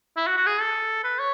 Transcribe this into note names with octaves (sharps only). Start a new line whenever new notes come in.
E4
F#4
F#4
G#4
A4
B4
C#5